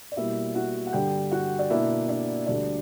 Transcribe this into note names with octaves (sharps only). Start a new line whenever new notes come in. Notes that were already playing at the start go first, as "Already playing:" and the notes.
D5
B2 G3 A#3 E4 E5
F#4 F#5
F#5
G2 D3 G3 G4 G5
F#4 F#5
D5
B2 A#3 D4 E4 E5
D4 D5
D2 D3 G3 D4 D5